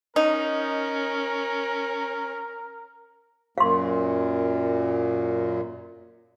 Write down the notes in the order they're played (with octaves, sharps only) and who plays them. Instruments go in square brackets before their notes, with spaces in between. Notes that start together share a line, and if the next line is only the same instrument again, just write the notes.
[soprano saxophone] C#4 [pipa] D#4 [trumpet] A#4
[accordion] F#2 A#2 [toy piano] F5 C6